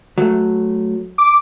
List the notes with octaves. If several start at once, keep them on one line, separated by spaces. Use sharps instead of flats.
F#3 A3
D6